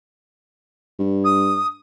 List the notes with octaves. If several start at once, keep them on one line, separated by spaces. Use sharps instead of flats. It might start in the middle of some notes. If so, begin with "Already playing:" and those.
G2
D#6